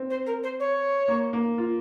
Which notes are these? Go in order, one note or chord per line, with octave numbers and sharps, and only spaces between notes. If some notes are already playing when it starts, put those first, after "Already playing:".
Already playing: C4
C5
A#4
C5
C#5
A#3
A#3
F4